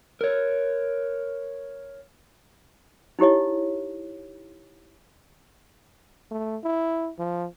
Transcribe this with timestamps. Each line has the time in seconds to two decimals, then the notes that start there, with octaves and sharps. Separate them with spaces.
0.21 A#4 C#5
3.19 D#4 E4 G4 C#5 D#5
6.31 A3
6.64 E4
7.19 F3